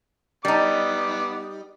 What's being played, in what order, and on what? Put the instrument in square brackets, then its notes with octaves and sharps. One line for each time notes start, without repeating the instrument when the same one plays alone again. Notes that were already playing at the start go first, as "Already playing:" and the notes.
[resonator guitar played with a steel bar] G3 D#4 [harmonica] B3 D6